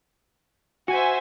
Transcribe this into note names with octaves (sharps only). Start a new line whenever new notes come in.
F#4 C5 E5 G#5